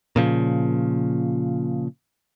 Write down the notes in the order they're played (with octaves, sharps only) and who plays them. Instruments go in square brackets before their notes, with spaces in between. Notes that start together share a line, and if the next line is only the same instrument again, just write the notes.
[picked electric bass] A#2 C#3 F3